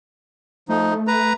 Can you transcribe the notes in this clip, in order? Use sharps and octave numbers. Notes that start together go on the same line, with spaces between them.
F3 A3 D#4
B4 A#5